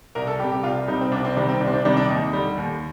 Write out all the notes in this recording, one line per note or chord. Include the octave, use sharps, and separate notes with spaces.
C2 A#4
A4
C3 G3 G4
G4
C2 F4
C3 G3 D#4
C4
C2 D4
C4
C3 D#3 G3 D4
C4
C2 D4
C4
D4
C3 D#3 G3 D4
D4
D#2 D#4
D3 G3
D#2